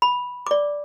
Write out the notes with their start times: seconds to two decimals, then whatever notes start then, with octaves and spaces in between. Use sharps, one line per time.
0.02 B5
0.47 D5 D6